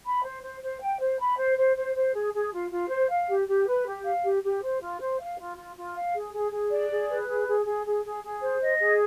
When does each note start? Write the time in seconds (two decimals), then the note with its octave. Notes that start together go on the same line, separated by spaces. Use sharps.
0.05 B5
0.24 C5
0.43 C5
0.62 C5
0.81 G5
1.00 C5
1.19 B5
1.38 C5
1.57 C5
1.76 C5
1.95 C5
2.14 G#4
2.33 G#4
2.52 F4
2.71 F4
2.90 C5
3.09 F5
3.28 G4
3.47 G4
3.67 B4
3.85 G4
4.05 F5
4.23 G4
4.42 G4
4.61 C5
4.80 F4
4.99 C5
5.19 F5
5.37 F4
5.56 F4
5.75 F4
5.94 F5
6.14 G#4
6.33 G#4
6.51 G#4
6.70 D5
6.89 G#4
7.09 B4
7.27 G#4
7.47 G#4
7.66 G#4
7.84 G#4
8.04 G#4
8.23 G#4
8.42 C5
8.61 D#5
8.80 G#4